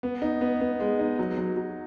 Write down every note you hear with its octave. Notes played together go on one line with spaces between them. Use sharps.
B3
D#4
B3
B3
G#3
D#4
F#3
F#3
F#3